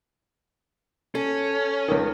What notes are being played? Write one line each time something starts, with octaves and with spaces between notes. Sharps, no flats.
C#4 A4
C#2 D#3